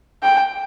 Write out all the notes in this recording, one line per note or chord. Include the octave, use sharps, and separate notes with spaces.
G5